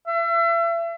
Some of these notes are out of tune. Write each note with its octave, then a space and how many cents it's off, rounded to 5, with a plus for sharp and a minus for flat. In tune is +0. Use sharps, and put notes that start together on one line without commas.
E5 +35